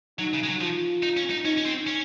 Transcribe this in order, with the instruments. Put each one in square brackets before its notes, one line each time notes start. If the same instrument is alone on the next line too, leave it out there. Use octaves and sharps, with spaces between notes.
[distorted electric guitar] F#3 [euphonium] D#4
[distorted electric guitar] C#3
G#3
F#3
[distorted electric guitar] F3 [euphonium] F4
[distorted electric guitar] D#4
C#4
D#4
[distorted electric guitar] C#4 [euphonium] D#4
[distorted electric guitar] C#4
C4
C#4